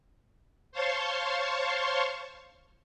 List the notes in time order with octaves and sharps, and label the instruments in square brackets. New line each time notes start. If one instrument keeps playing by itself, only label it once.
[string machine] C5 C#5 F5 A5 C6 C#6